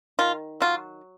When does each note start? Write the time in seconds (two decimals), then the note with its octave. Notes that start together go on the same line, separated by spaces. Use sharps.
0.19 D#3 F4
0.60 F#3 F4